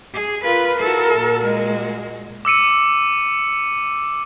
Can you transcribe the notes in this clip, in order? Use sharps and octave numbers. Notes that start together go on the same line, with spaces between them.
G#4
F4 A#4 B4
E4 F#4 A4
A#2 F#4
G#3
D6 E6 C#7 D#7